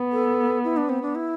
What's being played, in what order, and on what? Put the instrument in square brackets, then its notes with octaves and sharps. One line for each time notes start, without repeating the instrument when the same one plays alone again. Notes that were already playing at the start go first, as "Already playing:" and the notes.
Already playing: [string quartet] B3
[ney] A4
E4
D4
C4
D4
E4